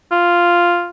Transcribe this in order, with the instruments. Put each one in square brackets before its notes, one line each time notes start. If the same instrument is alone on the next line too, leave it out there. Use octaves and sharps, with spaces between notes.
[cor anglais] F4